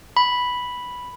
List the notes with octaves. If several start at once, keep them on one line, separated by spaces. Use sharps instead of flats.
B5